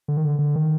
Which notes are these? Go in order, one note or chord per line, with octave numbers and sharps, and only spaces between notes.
D3
D#3
D3
D3
D#3